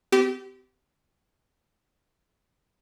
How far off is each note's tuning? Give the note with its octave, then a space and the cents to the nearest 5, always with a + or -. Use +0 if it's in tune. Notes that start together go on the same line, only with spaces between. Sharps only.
C4 -45 G4 -20